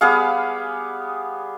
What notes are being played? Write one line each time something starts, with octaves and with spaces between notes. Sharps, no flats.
G3 B3 G#4 F5